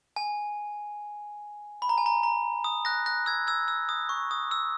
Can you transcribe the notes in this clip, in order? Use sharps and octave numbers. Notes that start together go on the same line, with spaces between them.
G#5
B5
A#5
G#5
A#5
A#5
D#6
F#6 A#6
F#6 A#6
E6 G#6
E6 G#6
E6
D#6
C#6
D#6
E6